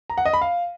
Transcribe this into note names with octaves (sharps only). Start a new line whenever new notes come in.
A#5
F#5
D#5
B5
F5